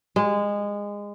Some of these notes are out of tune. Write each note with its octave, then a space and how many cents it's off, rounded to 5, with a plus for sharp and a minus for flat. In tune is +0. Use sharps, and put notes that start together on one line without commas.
G#3 -20